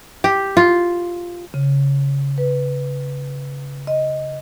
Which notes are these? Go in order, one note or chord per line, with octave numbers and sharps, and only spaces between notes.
G4
F4
C#3
B4
D#5